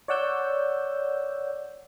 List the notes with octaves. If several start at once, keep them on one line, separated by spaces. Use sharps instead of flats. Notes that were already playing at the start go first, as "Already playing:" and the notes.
C#5 D5 F#5 E6 G6